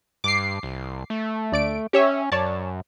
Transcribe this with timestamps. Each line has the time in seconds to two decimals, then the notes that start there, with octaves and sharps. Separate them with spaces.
0.24 G2 D6 C7
0.63 C2
1.10 A3
1.52 D2 D5 D7
1.93 C#4 G4 C#5 E5
2.32 F#2 C#5 D5 A5